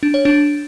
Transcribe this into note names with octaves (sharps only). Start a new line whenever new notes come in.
D4
C#5
D4